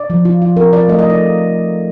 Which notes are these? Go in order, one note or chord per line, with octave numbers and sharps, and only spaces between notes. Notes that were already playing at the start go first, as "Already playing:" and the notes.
Already playing: D5
F3
F4
F4
C4 A#4
F4 D5
A3 D#5
D#5
D#4 D5